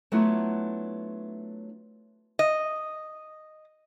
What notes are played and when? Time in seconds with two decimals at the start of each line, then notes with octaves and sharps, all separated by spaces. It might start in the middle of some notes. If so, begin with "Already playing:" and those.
0.12 F#3 A3 B3 D4 E4 F4
2.39 D#5